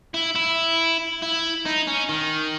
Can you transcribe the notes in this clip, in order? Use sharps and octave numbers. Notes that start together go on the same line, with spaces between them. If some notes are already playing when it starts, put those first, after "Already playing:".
E4
E4
E4
D#4
C#4
D#3